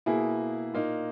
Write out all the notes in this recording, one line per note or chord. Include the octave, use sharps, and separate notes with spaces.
B2 A#3 E4 G#4
A#2 A#3 D#4